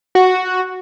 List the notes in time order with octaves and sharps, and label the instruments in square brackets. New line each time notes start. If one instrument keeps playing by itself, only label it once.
[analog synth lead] F#4